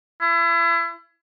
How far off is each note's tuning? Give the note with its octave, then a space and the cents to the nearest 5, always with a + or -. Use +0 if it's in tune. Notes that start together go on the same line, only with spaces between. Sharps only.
E4 +35